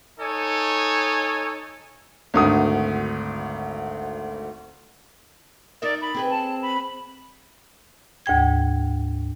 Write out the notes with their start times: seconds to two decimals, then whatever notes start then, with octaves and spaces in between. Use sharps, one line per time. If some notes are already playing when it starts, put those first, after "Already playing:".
0.20 D#4 A4 C#5 G#5
2.34 G#1 D2 D#6
5.82 D#4 A#4 D5 E5
6.01 B5
6.15 C4 G#4 B4
6.29 A5
6.61 B5
8.26 D2 G#2 G5 G#6